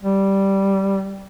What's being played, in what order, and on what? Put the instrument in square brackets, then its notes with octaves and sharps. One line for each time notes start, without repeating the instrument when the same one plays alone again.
[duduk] G3